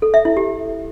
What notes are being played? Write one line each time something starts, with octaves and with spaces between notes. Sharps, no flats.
A4
E5
E4
G4